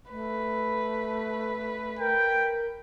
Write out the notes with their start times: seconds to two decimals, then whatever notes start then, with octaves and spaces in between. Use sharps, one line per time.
0.10 A3 B4
1.99 A#4 G5